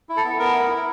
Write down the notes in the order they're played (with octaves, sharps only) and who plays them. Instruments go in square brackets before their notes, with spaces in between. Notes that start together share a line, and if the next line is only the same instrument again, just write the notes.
[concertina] E4
A4
B3
B3 A#4
E4
E4